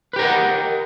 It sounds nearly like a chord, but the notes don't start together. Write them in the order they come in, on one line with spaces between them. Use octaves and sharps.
B4 G4 A#4 F#5 D#5